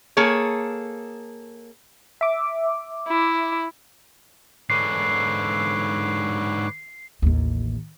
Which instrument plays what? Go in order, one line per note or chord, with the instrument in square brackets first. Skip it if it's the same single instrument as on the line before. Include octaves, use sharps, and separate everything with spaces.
[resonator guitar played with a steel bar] A#3 G#4 A4 C#5
[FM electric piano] E5 D6
[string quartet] E4
[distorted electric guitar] G#2 D3 [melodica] B4 C#5 D6 [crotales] C7
[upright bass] A1 D#2